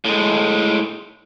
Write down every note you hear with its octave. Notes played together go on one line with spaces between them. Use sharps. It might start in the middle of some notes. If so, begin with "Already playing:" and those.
A2 G#3